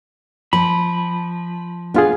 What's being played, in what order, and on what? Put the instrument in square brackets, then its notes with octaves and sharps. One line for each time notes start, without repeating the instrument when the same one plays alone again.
[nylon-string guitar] F3 [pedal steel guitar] B5
[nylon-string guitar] B3 [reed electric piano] D4 F4 G#4